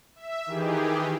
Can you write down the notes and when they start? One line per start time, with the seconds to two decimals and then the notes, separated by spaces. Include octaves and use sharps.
0.16 E5
0.46 D#3 E3 G4 G#4